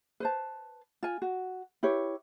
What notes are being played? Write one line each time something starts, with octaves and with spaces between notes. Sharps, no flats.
B4 C5 A5
F4 G#5
F#4
E4 G4 B4 C#5